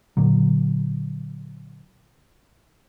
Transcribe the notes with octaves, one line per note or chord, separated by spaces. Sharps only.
A#2 D3 F#3